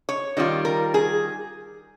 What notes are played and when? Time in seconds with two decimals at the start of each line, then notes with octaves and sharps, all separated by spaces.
0.09 C#5
0.37 D#3 G3 C#4 F4
0.65 A#4
0.94 G#4